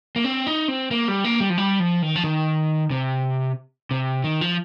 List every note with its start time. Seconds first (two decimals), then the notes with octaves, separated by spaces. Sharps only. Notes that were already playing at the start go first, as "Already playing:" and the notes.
0.16 A#3
0.24 C4
0.47 D#4
0.68 C4
0.91 A#3
1.08 G3
1.24 A#3
1.40 G3
1.50 F3
1.58 G3
1.80 F3
2.02 D#3
2.16 F3
2.24 D#3
2.91 C3
3.91 C3
4.24 D#3
4.41 F3